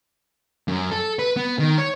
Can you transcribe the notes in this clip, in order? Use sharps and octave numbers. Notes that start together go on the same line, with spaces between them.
F#2
A4
B4
B3
D#3
C#5